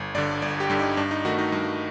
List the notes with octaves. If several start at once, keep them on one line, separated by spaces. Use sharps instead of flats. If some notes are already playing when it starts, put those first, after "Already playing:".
Already playing: G1
G2 D3 D5
G1 D5
G4
G2 D3
D#4
G2 D4
D#4
D#3 A3 F#4
D#4
G2 F#4